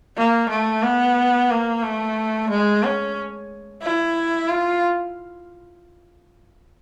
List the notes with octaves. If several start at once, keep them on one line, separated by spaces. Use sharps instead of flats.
A#3
A3
B3
A#3
A3
G#3
C#4
E4
F4